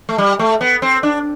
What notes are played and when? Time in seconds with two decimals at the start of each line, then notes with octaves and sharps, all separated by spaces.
0.09 A3
0.18 G3
0.39 A3
0.61 B3
0.82 C4
1.03 D4